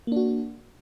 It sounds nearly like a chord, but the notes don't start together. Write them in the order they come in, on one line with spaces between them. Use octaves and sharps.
A#3 D4 F#4